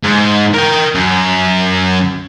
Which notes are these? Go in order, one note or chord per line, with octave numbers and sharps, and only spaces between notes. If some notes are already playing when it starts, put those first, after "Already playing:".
G#2
A#4 G5
F#2